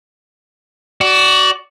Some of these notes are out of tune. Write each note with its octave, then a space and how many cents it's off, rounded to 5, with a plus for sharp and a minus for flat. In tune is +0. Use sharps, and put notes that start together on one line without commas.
F#4 +25 D5 -5